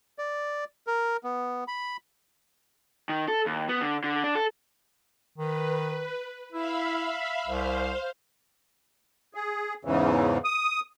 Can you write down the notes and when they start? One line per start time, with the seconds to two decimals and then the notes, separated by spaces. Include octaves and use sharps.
0.19 D5
0.87 A#4
1.24 B3
1.68 B5
3.09 D#3
3.28 A4
3.46 D#2
3.69 B3
3.82 D3
4.04 D3
4.24 D4
4.35 A4
5.38 D#3 B4
6.52 E4 E5 F5 B5
7.46 C2 C5 F5
9.34 G#4
9.85 E2 G#2 C#3 E3
10.44 D#6